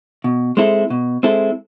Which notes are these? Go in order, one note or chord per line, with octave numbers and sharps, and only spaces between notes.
B2
G#3 C4 E4 A4
B2
G#3 C4 E4 A4